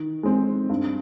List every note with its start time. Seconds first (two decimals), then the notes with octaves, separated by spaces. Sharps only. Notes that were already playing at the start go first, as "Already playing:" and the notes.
Already playing: D#3
0.23 G#3 C4
0.69 G2